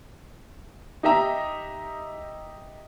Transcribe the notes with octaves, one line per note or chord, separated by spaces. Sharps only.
D#4 G4 D#5 E5 A#5